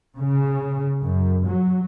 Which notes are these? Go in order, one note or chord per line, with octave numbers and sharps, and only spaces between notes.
C#3
F#2
F#3